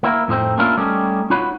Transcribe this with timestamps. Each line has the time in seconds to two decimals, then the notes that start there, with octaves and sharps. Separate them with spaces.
0.03 A#3 E4 A#4
0.28 F2 A2 G#3 C4 D#4
0.58 A#3 C#4 D4 E4 F4 A#4
0.78 G3 A3 C#4 D#4 G4
1.30 D#4 F4 F#4 B4 C#5 B5